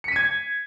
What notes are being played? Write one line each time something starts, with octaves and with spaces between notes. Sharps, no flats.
G#6 B6 C#7 D#7